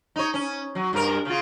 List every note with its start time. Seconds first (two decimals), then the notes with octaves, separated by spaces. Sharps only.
0.16 D#4 C#5
0.34 C#4
0.75 F#3
0.93 G2 A#4
1.25 C#3 F4